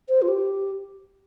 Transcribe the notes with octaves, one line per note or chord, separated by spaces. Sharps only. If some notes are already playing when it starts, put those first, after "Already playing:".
C5
F4
G4